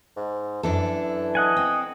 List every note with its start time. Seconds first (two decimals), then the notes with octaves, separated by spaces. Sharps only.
0.16 G#2
0.63 F#2 E3 D4 A4
1.35 D#5 F#5 G#5
1.57 C4